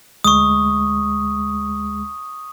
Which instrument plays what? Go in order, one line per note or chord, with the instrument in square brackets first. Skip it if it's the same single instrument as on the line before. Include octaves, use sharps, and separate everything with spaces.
[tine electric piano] D2 G#3 [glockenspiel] C#6 D#6